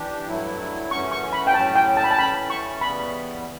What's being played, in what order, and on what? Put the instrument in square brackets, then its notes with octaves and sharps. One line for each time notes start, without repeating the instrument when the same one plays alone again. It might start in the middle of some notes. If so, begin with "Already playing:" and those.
Already playing: [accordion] E3 D4 G4
G2 F#3 A3 E4
[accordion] F#2 E3 A3 C#4 F#4 [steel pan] C#6
[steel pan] C#6
B5
G5
[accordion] A2 F#3 C#4 [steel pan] A5
[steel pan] G5
A5
B5
A5
[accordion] E3 A3 C#4 [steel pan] B5
[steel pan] C#6
[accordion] C#3 E3 G3 B3 [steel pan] B5